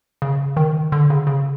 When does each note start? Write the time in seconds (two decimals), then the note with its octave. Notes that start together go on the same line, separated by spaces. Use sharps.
0.22 C#3
0.57 D#3
0.92 D3
1.10 C#3
1.27 C#3